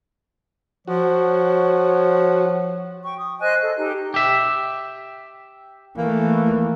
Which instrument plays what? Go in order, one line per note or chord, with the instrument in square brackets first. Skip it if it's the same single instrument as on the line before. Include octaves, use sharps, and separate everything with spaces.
[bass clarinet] F3 [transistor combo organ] F#4 [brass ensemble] C#5
[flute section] G5 C#6
D#6
C5 D#5 G#5 F#6
A4
D#4 G4
[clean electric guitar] G4 E5
[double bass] E3 A3 [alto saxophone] A#3